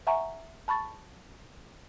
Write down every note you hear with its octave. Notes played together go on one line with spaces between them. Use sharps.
E5 F#5 G#5 A#5 C#6
A5 B5 C#6 A6